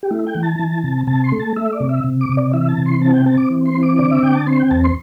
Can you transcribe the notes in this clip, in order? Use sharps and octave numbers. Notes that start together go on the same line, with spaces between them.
G4
A3 E4
G5
E3
A5
E3
C3
C3 A5
C6
A3
A5
A3 E5
D5
C3
E5
C3
D6
C3
D5
E3 E5
A5
C3
C6
C4 A5
G5
C4 A5
D6
E3
C6
C4
D6
D3 D5
E5
D3 G5
A5
C4 C6
G5
E2 A5
C6